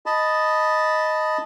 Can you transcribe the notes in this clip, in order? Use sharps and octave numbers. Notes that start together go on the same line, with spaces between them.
D#5 A5 B5